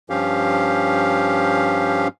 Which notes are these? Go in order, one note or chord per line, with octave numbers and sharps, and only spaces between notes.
G2 F3 C#4 G4 F5